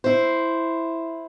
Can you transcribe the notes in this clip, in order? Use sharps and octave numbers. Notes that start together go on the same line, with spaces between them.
E4 C5